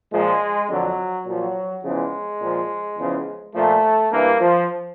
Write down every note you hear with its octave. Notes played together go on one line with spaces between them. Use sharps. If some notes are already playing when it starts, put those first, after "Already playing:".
A#2 F3 G#3
F2 D3 F3 F#3
A#2 F3 F#3
E2 C#3 F3 G#3
A#2 F3
E2 C#3 F3
A#2 F3 A3
G2 E3 A#3
F3